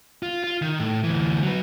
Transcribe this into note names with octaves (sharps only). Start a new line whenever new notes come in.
F4
F4
D#3
A2
D2 E3
F#3 B4